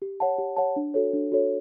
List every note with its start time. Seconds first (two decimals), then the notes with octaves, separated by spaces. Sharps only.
0.02 G4
0.20 C#5 F#5 A5
0.38 G4
0.57 C#5 F#5 A5
0.76 D4
0.94 F#4 A4 C#5
1.13 D4
1.32 F#4 A4 C#5